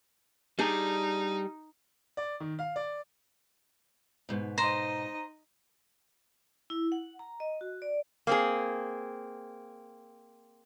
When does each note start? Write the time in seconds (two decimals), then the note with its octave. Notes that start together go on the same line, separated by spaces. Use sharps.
0.59 G3 D4 D#4 G#4
2.17 D5
2.40 D#3
2.59 F5
2.76 D5
4.29 G#2 B2
4.58 D#4 C5 D#5 A#5
6.70 E4
6.92 F#5
7.19 A#5
7.40 D#5
7.61 F#4
7.82 D5
8.27 A#3 C4 G#4